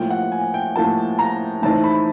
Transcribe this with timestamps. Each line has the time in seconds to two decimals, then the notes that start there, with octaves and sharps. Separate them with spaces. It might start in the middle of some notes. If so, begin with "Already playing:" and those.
Already playing: A2 F3 A#3 G5
0.10 F#5
0.32 G#5
0.54 G5
0.76 A2 F3 A#3 A5
1.19 A#5
1.62 A2 E3 A3 C4 D#4 A5
1.84 B5